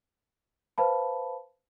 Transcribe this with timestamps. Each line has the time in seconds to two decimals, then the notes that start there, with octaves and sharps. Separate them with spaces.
0.78 B4 C5 F5 A5 B5